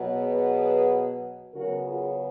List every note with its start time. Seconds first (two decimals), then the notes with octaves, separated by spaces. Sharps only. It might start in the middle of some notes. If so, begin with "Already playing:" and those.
Already playing: B2 F#3 B3
0.14 G#4 B4
1.54 C#3 F#3 B3 F#4 A#4
1.85 F4 G#4